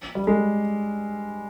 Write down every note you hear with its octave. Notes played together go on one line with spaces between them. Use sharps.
G3
G#3